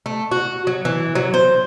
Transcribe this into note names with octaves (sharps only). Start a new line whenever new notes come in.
A3
F#4
F#3
E3
F#3
C5